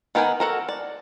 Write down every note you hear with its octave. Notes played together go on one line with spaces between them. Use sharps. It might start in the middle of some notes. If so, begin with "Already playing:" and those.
D#3 B3 A#4 G5 G#5
F#4 A4 A#4
D5